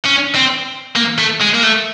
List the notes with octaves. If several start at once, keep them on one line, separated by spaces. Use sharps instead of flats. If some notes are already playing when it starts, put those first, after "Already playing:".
C#4
C4
A#3
A3
G#3
A#3
A3